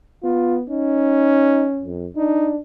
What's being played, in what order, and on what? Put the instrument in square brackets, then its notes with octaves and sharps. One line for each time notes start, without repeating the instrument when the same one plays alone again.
[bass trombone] B3 [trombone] F4
[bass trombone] C#4 [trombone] D#4
[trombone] F2
[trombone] D4 [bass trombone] D#4